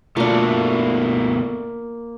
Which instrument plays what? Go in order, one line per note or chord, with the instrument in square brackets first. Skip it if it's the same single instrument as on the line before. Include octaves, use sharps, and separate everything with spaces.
[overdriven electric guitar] B2 A3 [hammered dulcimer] A#3 [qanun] D4 F4